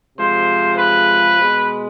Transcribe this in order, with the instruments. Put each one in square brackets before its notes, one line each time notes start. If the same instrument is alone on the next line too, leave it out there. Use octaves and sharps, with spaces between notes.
[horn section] C3 F3 G#3 C5
B4
B2 G#3